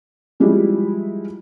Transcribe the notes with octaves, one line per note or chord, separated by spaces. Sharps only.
F3 G3 G#3 E4 G4